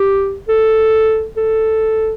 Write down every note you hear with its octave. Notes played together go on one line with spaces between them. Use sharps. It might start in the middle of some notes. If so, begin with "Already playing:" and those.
Already playing: G4
A4
A4